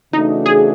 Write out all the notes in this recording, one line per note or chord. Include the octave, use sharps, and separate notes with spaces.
C#3 E3 A3 D4 D#4 F#4
G#4